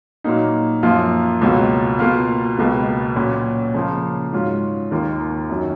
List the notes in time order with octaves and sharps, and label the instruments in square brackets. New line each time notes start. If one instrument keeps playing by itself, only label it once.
[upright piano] A#2 F#3 A#3 D#4
F#2 F3 A#3 F4
C#2 B2 F#3 A#3 F4
B2 A#3 F4
C#2 B2 A#3
A#2 F#3 C#4
C#3 F3 A#3
G#2 F#3 C#4 F4
D#2 D#3 A#3 F4
F#2 D#3 F#3 C#4